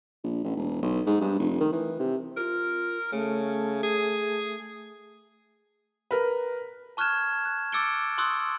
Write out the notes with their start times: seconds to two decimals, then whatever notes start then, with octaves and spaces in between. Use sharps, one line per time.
0.24 A#1
0.44 A1
0.56 E1
0.82 B1
1.06 G#2
1.21 G2
1.39 F1
1.60 D#3
1.72 E3
2.00 C3
2.37 F4 A#4
3.12 C#3 A3
3.83 G#4
6.11 A#4 B4
6.97 A5 C#6 F6 F#6 G#6 E7
7.45 F#6
7.72 D6 E6 A6 C#7 D7 G7
8.18 C6 C#6 D#6 E6 F#6